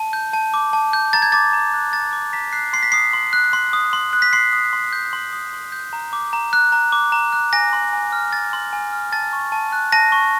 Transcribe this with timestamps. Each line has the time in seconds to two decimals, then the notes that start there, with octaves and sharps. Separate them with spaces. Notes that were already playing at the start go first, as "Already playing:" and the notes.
Already playing: A5
0.13 G6
0.33 A5
0.54 D6
0.73 A5
0.93 G6
1.13 A#5 A6
1.22 G#6
1.32 D6 A6
1.53 A#5
1.74 F#6
1.93 A#5 A6
2.13 D6
2.33 A#5 B6
2.53 F#6 C7
2.73 C6 C7
2.83 B6
2.92 D#6 C7
3.13 C6
3.33 F#6
3.53 C6
3.73 D#6
3.93 C6
4.13 F#6
4.22 B6
4.33 C6 C7
4.53 D#6
4.73 C6
4.93 G6
5.13 C6
5.33 D#6
5.53 C6
5.72 G6
5.93 A#5
6.13 D6
6.33 A#5
6.53 F#6
6.72 A#5
6.92 D6
7.12 A#5
7.33 F#6
7.53 G#5 A#6
7.73 C6
7.93 G#5
8.12 F6
8.33 G#5 A6
8.53 C6
8.73 G#5
8.93 F6
9.12 A5 A6
9.33 C#6
9.52 A5
9.73 F#6
9.92 A5 A#6
10.12 C#6